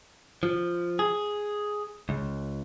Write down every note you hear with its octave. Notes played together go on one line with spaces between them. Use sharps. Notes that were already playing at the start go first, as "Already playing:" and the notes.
F3
G#4
C#2